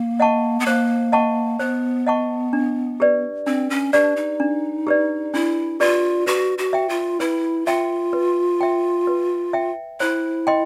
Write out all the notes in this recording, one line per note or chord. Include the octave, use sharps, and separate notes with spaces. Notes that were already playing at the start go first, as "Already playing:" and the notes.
Already playing: A#3
D#5 F#5 A5 C#6
B3
A#3 C5
D#5 F#5 A5 C#6
B3 C5
D#5 F#5 A5 C#6
D4
G4 B4 D5
C4 D4
C#4
D4 G4 B4 D5
D#4
D4
G4 B4 D5
D4 E4
F4 G4 B4 D5
F#4 B4
F#4
E5 G5
F4
E4 B4
F4 E5 G5
B4
E5 G5
B4
E5 G5
E4 C5
D#5 G5 C6